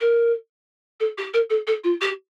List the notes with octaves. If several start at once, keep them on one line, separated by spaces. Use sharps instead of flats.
A#4
A4
G4
A#4
A4
A4
F4
G4